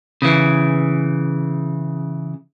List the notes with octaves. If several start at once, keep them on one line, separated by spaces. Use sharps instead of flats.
C#3 E3